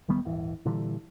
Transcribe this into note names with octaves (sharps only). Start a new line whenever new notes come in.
D1 D#3 G3 B3
D#1 G#1 E3
A#2 D3 E3 G3